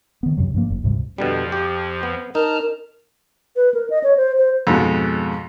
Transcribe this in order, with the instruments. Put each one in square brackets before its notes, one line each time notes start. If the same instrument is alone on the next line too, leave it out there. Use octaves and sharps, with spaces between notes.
[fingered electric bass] D#3 B3
F#2 C3 F#3
G2 F3 A#3
F#1
D2 G#2 C3 G3
[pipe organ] F2 F3 [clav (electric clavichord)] B2 D3 G3
[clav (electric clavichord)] G4
B3
[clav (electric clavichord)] D#4 [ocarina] A#4 [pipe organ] A5 A#5 F6
[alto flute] B4
A#4
D#5
C#5
C5
C5
[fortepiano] F2 G#2 B2